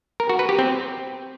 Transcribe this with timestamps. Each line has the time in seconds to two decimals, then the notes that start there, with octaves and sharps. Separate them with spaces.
0.20 A#4
0.29 F#4
0.39 B4
0.49 G4
0.59 C4